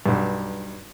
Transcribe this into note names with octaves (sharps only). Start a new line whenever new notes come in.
B1 G2